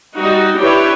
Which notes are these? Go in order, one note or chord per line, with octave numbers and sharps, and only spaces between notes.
G3 D#4 F#4
D4 E4 G4 B4 C#5